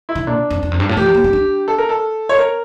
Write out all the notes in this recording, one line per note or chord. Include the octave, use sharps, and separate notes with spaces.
E4
D3
A#2 D4
F2
E2
F2
G2
A2
E3 G4
F3
A#3
C#4
D4
A4
A#4
A4
C#5
A#4